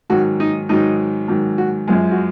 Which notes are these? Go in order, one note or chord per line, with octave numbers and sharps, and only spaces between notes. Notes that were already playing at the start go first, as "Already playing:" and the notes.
G#2 D#3 F#3 F#4
D#4
G#2 D#3 F#3 D#4
G#2 D#3 F#3
F#4
F#2 F3 G#3
F#4